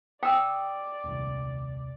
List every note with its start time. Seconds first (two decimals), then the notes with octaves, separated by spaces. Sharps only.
0.23 D5 G5 D#6 E6
1.04 D#1 C2